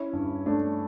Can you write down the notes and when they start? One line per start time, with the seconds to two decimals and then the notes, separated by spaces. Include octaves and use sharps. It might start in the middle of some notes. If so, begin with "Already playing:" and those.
Already playing: C#4 E4
0.13 G2
0.46 A3 D4